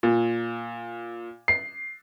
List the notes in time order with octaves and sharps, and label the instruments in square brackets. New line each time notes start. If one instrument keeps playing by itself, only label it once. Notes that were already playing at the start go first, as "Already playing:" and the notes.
[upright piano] A#2
C7